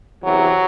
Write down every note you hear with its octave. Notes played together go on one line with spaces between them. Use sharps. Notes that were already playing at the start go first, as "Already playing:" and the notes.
E2 C3 E3 F#3